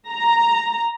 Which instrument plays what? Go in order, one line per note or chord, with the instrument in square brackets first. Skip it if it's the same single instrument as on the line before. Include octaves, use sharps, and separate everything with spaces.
[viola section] A#5